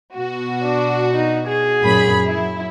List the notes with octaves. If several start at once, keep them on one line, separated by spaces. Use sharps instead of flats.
B2 F#4
D4
D#4
G#4
F#2 A#2 B5
F#3 E4